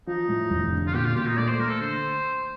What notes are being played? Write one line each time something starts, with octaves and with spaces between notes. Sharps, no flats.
F3 D#4
A2
F1
D3
F4
A#2 G4
F4
A#2 G4
D#4
A3 D5
C5
A3 A#4
A4
D3 C5